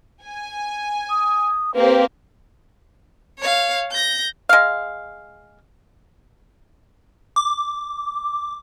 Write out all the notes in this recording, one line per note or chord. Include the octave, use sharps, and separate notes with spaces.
G#5
D#6
A#3 C4 G4 B4
C#5 F5
G6 A#6
G#3 F5
D6